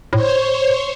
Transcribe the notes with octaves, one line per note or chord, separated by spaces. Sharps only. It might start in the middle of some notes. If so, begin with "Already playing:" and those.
A2 C5 C#5